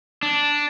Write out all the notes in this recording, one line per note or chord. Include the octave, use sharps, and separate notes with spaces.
D4